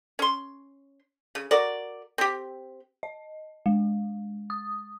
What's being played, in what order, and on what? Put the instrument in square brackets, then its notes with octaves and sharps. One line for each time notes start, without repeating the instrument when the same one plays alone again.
[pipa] C#4 C6
C#3
F#4 A#4 D5
C4 G4
[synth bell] D#5
G#3
D#6